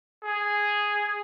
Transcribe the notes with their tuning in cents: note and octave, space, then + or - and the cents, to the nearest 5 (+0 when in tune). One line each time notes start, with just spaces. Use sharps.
G#4 -5